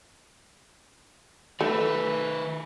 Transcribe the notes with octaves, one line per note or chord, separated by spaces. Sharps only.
D#3 A3 B4